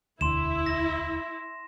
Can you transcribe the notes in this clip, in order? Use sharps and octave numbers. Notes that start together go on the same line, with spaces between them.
E1 D2 E4 C6 E7
A#6